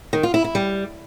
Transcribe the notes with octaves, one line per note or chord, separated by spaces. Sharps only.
D#3
F4
E4
E4
G3